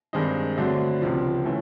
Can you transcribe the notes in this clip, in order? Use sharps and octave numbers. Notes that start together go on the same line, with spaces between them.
G2 D#3 G#3 C4 D#4
D3 F#3 A3 C4
C#2 C3 F3
E3 A3 C#4